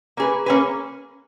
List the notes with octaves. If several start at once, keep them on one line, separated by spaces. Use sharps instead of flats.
A#3 C#4 G#4 B4
A#3 C#4 G#4 B4